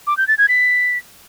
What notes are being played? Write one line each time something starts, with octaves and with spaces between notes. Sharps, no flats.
D6
G6
A6
G#6
B6